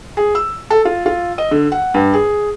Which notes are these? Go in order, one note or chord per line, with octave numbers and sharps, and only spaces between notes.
G#4
E6
A4
F4
F4
D#5
D3
F#5
G2
G#4